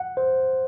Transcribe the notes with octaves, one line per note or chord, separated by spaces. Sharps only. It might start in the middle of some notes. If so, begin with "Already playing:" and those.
Already playing: F#5
C5